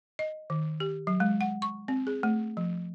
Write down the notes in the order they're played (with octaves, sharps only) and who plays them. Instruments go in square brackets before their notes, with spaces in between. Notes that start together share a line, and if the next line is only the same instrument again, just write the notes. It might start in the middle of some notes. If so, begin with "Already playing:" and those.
[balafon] D#5
D#3
G4
F#3
G#3
F#5
C#6
C4
G#4
A3
F3